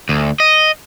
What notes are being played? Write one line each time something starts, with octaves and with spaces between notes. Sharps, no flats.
D2
D#5